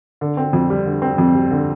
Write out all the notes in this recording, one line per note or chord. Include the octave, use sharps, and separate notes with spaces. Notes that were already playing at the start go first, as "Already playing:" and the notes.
D3
C4
F2
G3
D3
C4
F2
G3
D3